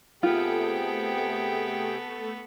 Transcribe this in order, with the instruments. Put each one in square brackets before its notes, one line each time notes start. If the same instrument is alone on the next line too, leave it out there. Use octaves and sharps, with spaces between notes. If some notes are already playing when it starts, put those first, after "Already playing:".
[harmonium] C3 G#4 G5 [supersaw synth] A3 A4 [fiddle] B3 [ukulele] F4